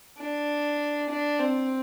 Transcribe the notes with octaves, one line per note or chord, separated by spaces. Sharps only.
D4
D4
C4